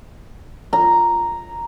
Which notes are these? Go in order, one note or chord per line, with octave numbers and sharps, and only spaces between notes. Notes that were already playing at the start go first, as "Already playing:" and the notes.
A#5